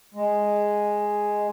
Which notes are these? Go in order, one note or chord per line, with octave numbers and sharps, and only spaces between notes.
G#3